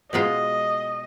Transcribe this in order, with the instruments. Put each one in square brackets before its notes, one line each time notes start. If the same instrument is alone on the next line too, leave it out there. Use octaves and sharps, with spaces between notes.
[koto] B2 G#3 B3 F4 [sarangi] D#5